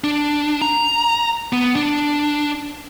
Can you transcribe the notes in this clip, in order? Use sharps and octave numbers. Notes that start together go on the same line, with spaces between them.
D4
A#5
B3
D4